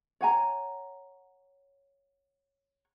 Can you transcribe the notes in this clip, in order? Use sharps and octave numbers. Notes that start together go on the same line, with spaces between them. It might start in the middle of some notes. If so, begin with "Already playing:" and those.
C#5 F#5 G#5 A#5